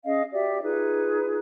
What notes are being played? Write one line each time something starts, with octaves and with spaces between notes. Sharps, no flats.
C#4 G#4 D#5 F5
F#4 G4 D5 E5
D#4 F4 G#4 B4